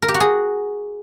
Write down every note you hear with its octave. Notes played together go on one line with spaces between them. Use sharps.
A#4
G4
F#4
G#4